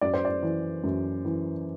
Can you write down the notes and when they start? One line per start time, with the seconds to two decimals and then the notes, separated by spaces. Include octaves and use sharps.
0.01 F#2 D5
0.14 C5
0.25 D5
0.43 E3
0.84 F#2
1.25 E3